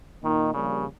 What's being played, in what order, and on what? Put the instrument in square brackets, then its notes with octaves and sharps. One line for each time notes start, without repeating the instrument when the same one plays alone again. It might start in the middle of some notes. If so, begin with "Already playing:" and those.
[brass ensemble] A#2 A#3 D#4 [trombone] D#3
[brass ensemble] A#1 A#2 G3 [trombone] C#3